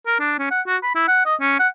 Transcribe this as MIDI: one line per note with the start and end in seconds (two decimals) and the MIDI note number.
0.06 0.17 70
0.19 0.34 62
0.39 0.46 61
0.51 0.61 78
0.67 0.77 66
0.83 0.91 83
0.95 1.04 64
1.08 1.25 78
1.26 1.35 75
1.41 1.57 61
1.59 1.68 78